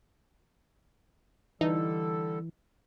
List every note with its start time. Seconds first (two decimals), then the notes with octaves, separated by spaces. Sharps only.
1.61 D3 E3 G3 D#4 A4